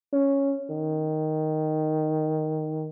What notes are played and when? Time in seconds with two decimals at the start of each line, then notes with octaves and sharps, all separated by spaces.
0.13 C#4
0.70 D#3